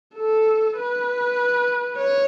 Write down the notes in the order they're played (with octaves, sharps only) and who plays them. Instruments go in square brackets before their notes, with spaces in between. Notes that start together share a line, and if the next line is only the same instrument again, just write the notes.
[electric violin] A4
B4
C#5